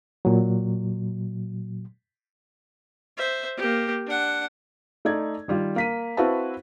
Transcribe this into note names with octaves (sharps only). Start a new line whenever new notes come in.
A#2 F#3
C5 E5
A#3 G4
D4 F#5
A3 D#4 D5 G#6
D#3 G3 F4
A#3 B6 D#7
C4 E4 F#4 B4 F5 A5